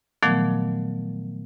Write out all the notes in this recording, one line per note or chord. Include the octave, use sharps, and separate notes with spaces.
A#2 D#3 F3 F#3 A3 B3